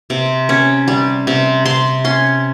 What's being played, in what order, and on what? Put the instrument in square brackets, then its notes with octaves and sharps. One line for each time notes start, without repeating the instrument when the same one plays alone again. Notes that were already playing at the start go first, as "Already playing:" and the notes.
[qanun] C3
C#4
G3
C3
C3 C6
C#4 C6